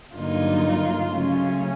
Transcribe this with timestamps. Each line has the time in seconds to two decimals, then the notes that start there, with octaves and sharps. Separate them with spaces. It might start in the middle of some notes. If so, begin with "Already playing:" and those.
0.15 G2 D3 F#3 A#3 D#4 F4
1.11 C#3 F#3 A3 C#4